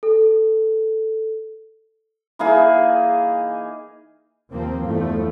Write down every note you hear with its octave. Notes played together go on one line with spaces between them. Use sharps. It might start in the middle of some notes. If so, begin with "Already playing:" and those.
A4
E3 A#3 D#4 G#4
D#2 F3 A#3 C4
E2 G2 F3 A3